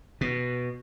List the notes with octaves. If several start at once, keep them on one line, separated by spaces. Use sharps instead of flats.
B2